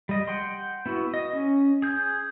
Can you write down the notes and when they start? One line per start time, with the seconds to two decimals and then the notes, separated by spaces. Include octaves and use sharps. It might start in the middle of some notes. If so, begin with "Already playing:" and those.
0.09 G3 D#5
0.28 F#5 G5 C6
0.86 B3 E4 F#4
1.14 D#5
1.33 C#4
1.82 G#4 G6